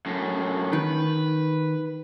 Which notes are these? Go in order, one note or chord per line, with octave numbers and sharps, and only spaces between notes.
F#2 A2
D#3 B4